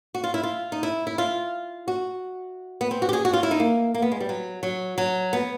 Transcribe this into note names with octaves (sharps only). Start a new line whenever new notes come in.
F#4
F4
E4
F4
D#4
E4
E4
F4
F#4
B3
C4
F#4
G4
G#4
F#4
F4
E4
D#4
A#3
A#3
B3
G#3
G3
F#3
F#3
F#3
B3